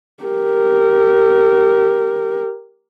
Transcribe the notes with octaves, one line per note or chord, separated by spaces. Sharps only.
G4 A#4